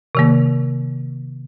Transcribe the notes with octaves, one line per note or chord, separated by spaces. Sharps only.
C3 D#3 A#3